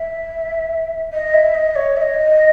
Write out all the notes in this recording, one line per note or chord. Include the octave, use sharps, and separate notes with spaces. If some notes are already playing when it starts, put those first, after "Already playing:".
Already playing: E5
D#5
E5
D#5
C#5
E5
D#5